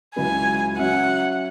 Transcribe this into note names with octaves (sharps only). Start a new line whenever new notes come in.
C#2 C#3 F#3 E4 B4 G#5
F#3 C#4 F#4 E5 F#5